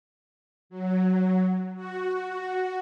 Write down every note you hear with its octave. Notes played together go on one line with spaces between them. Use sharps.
F#3
F#4